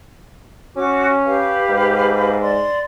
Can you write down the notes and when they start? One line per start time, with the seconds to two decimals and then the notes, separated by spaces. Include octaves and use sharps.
0.77 C#4 F#4 D6
1.25 G4 B4 F5
1.70 G#2
2.42 D5 C6